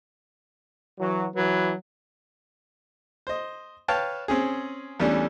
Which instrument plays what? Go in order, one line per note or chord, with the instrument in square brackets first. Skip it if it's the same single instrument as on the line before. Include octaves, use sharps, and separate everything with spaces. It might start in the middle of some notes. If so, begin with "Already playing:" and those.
[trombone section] E3 F#3
[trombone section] E3 B4 [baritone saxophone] F#3
[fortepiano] C5 D#5
B4 C#5 F5 G5 A5
C4 C#4 G#4
E2 E3 G3 A3 C#4 D4